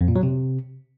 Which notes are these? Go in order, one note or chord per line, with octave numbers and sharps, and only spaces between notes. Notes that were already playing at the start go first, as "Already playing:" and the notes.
F2
A#2
F#3
C3